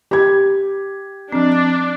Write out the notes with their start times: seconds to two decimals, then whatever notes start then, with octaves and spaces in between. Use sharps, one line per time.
0.11 G4 G#6
1.32 F3 C4 D4